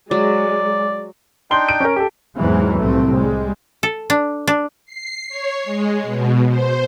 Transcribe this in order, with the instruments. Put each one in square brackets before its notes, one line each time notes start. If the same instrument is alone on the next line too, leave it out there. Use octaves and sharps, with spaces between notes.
[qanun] F#3 [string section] G#3 [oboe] D5
[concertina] D4 D#4 G5 [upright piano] C6 G7
[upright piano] D7
C#4 A#4
G4 A4
[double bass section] E2 G#2 E3 F#3 G#3 C4
C2 A2 A3 C4
G3 G#3
[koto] A4
D4
D4
[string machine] C7
C#5
G#3
B2
C5